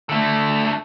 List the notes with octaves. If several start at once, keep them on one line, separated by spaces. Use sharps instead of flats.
D3 A3